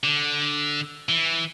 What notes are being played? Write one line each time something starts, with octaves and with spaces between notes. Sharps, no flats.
D3
E3